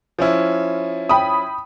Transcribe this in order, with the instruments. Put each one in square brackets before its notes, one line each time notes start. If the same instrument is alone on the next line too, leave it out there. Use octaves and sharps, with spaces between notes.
[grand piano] F3 C#4 E4
[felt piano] G5 B5 D#6